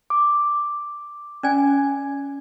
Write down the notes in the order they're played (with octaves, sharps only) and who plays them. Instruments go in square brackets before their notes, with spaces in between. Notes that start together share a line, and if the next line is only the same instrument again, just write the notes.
[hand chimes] D6
[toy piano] C#4 D5 G#5